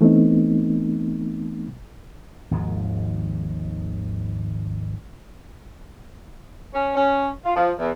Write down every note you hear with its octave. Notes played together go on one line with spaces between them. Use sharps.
E3 A3 B3 C4 D#4
G#1 D#2 G#2 F3
C#4
C#4
F4
F3
E2